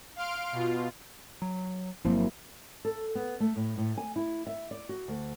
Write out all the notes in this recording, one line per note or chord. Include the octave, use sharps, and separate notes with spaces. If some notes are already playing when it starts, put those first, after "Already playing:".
F5 C6 F6 D7
B2 F4
F#3
G1 F3 F#3 A#3 C4 E4
A4
B3
A3
A2
A2
G#5
E4
E5
D5
F#4
D2